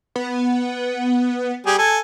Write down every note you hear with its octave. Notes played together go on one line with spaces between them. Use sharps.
B3
G3 G4 G#4
A4 G#5